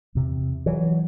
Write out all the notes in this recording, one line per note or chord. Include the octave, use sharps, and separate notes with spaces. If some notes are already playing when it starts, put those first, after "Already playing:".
E2 C3
E3 F#3